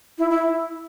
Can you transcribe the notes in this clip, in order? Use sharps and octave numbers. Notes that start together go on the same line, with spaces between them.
E4
E4